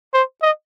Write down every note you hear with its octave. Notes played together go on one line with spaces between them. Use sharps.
C5
D#5